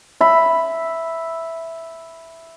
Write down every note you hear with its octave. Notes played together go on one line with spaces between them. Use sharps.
E5 B5